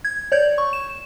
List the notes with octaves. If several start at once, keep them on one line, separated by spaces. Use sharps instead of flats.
G#6
C#5 D5 G6 G#6
C#6
E7